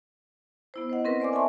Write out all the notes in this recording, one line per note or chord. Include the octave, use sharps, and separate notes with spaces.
B3 E4 C5
C5 D#5 F#5
C4 C#4 A#4 B4
C5 D5 G#5 D6
E5 G#5 A5 C6 C#6